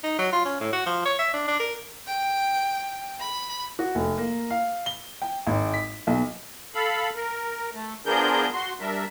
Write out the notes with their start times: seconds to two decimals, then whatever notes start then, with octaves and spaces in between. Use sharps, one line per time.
0.03 D#4
0.19 F#3
0.32 F4
0.45 C#4
0.61 A2
0.73 F#4
0.86 F3
1.05 C#5
1.19 E5
1.33 D4
1.48 D4
1.60 A#4
2.07 G5
3.20 B5
3.79 F#4
3.95 F1
4.18 A#3
4.50 F5
4.86 G7
5.22 G5
5.47 G#1
5.74 B6
6.07 B1
6.75 A4 F5 B5
7.15 A#4
7.74 A3
8.06 F3 B3 D4 G#4 A#4 G6
8.53 F#4 C6
8.80 G3 D4 A#4 E5